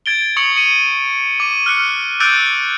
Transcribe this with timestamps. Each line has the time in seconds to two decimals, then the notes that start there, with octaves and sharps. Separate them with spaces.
0.06 G#6 A6 D7 G7
0.37 C#6 D#6 C#7 F#7
0.57 C#7 D#7
1.40 D6 D#7
1.66 F6 F#6 C#7
2.20 D6 E6 F#6 G6 A6 D7